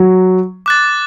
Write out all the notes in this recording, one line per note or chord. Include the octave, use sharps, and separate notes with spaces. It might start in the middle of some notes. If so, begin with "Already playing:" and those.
Already playing: F#3
D6 F#6 A6